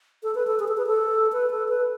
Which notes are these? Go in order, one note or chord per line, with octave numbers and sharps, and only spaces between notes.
A4
B4
A4
G#4
A4
B4
A4
B4
A4
B4